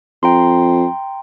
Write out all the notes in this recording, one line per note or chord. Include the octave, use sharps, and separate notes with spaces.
F2 G5 A#5 C6